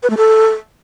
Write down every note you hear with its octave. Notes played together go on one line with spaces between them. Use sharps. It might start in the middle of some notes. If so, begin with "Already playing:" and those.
B4
A3
A4